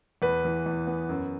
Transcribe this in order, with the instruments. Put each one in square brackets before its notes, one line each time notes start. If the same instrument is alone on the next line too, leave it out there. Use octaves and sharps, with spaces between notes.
[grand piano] E2 B4
E3
E2
B3
F#2